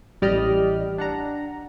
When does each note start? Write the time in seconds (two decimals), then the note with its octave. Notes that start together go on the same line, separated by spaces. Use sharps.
0.22 A1 G3 G4 D5 D#5 F6
0.98 D4 F#5 A#5